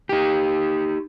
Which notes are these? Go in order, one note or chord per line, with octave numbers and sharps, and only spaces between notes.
D#4 G4